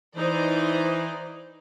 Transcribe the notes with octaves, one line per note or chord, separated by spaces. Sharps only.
E3 D#4 C5 D5